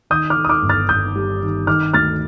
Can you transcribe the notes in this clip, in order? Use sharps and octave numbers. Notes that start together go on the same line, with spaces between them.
D#3 D#6 G6
D6 F6
D#3
D#6
D6 F6
G1
F6 A6
G1 D#6 G6
G3
D#3
D#3 D6 F6
D2 F6 A6